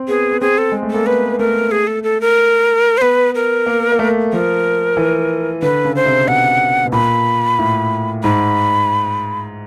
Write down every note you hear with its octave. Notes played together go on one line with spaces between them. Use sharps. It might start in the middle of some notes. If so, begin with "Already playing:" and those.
Already playing: C4
B3 G#4
B3
C4 G#4
A4
G#3
A3
A#3 A4
B3 B4
A3 A#4
G#4
A4
A4
A#4
C5
B3 B4
A#4
A#3
A#3
A3
F3 A#4
E3
D3 B4
C#3
C5
C3
B2 F#5
B2
A#2 B5
A2
G#2 B5